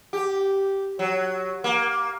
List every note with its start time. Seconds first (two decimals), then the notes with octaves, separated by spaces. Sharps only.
0.13 G4
0.99 F#3
1.64 A#3